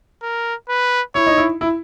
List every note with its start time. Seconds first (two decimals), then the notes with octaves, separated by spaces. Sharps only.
0.22 A#4
0.69 B4
1.15 E4 C#5
1.27 D#4
1.38 E4
1.61 E4